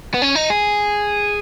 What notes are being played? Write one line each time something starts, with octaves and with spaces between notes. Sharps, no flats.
B3
C#4
D#4
G#4